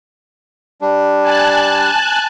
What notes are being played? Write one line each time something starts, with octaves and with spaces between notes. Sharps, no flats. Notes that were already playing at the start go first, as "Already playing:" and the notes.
G3 D4
G#5 A5 F#6